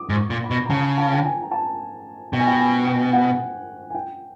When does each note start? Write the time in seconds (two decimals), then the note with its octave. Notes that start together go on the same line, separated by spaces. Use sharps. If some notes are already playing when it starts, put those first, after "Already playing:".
Already playing: D6 D#6
0.10 G#2
0.16 C#6
0.30 A#2
0.44 B5
0.51 B2
0.65 A#5
0.70 C#3 A5
0.98 A5
1.14 G5
1.25 G#5
1.42 A#5
1.51 A5
2.33 B2 G5
2.39 G#5
2.47 G5
2.59 G#5
2.86 G5
3.13 F#5
3.90 G#5
3.95 G5